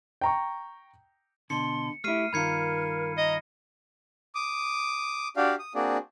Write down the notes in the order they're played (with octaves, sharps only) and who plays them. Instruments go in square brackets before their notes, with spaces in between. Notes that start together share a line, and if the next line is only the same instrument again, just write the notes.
[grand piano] G5 A#5 C#6
[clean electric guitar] B2 D3 [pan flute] C6 [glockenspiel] C#7
[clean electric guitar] A3 E4 [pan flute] G4 [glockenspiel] F6 C7 D#7
[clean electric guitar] G2 D#3 F4 [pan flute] A#4 [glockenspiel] B5 G#6 C#7
[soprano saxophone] D#5 [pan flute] A#5 [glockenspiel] A#6
[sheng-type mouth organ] D6 D#6
D4 F#4 G4 D5 F5
D#6
A#3 C4 D4 F#4 G#4 D5